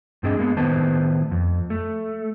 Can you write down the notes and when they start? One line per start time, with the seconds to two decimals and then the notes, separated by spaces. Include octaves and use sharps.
0.23 G2 C4 D4 G#4 D#5
0.37 G#3 A#3 B3
0.57 A2 D#3 B3 B4 C5 A5
1.31 F2
1.70 A3